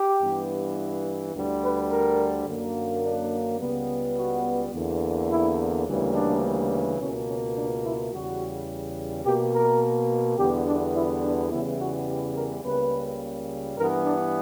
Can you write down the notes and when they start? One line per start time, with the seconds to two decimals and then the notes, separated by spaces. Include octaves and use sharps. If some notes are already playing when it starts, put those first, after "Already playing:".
Already playing: G4
0.21 G2 E3 B3
1.35 D2 D3 G3
1.63 B4
1.91 A#4
2.47 F#2 D3 F#3 A#3
3.04 D4
3.59 C#2 C#3 G3 B3
4.17 F#4
4.73 E2 D3 A#3
5.29 E4
5.86 D2 C#3 E3 G3 A#3
6.13 D4
6.98 C#2 B2 A#3 C#4
7.27 C#4
7.55 D4
7.84 E4
8.11 E2 C#3 G3 F#4
9.24 B2 A#3 G4
9.54 A#4
10.38 E2 D3 G3 B3 G4
10.66 D4
10.94 E4
11.22 D4
11.50 E2 C#3 E3 G3 B3 E4
11.79 F#4
12.08 G4
12.35 A#4
12.63 C#2 C#3 G3 A#3 B4
13.76 G2 E3 B3 A#4
14.04 D4